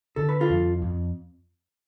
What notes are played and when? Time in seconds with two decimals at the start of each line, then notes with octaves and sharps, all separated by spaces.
0.16 D3 A4
0.29 B4
0.41 F4 A4
0.49 F2
0.82 F2